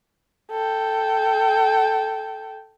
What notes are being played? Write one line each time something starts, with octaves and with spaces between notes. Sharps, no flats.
A4 G5